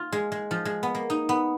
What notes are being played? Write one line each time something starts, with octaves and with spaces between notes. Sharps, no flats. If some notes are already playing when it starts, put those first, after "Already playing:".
Already playing: F4
G#3
G#3
F3
G#3
B3
A#3
D#4
B3